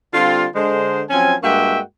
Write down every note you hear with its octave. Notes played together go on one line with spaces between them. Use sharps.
D3 G3 C4 F4
D3 G#3 C5
F3 F#3 C4 C#4 G#5
G2 G#3 A#3 F#4 E5 G5